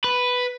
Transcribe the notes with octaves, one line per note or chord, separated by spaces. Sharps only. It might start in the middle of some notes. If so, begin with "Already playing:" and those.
B4